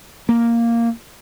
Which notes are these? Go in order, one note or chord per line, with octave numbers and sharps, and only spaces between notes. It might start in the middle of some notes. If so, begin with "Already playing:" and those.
A#3